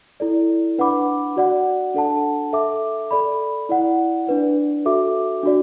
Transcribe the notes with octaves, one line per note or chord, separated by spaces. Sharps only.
E4 A4 D5
D4 B4 F#5 B5 D6
F#4 D5 F#5
D4 A4 F#5 A5
A4 E5 D6
A4 D5 B5
E4 D5 F#5
D4 B4 D5
F#4 A4 E5 D6
D4 F#4 D5